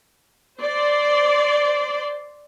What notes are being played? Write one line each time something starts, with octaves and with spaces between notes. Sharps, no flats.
C5 D5 C6